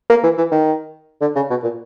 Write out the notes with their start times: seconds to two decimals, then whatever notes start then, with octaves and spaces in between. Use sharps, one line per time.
0.10 A#3
0.23 E3
0.38 E3
0.52 D#3
1.21 D3
1.36 C#3
1.50 B2
1.64 A#2